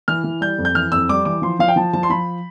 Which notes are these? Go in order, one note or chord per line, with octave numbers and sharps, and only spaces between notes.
E3 F6
E3
G3 G6
F2
G6
E3 F6
F2 E6
G3 D6
E3 D6
F3 C6
F3 F5
G5
F3 A5
F3 A5
C6
F3 B5